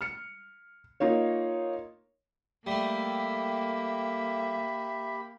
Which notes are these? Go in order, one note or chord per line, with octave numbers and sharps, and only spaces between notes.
F6 C#7
A#3 D#4 F4 C#5
G3 A3 A#3 G4 E5 B5